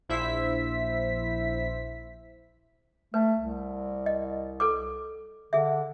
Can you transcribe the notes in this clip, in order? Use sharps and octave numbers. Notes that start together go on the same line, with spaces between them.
A#1 E4 C5 E5 B6
A3 B4
C2
D#5
A4 B4 D6
D3 G#4 E5